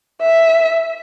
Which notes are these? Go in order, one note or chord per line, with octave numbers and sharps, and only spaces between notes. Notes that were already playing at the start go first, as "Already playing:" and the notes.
E5